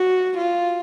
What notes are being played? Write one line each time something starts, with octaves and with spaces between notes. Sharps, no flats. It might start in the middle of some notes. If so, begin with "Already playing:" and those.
Already playing: F#4
F4